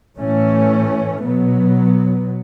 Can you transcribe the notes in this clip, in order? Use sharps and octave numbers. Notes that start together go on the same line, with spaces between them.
A2 E3 A3 C#4
B2 F#3 B3